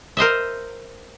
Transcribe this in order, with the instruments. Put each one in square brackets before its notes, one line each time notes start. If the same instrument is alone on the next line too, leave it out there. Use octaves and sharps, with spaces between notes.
[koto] A#4 C5 D#5 E5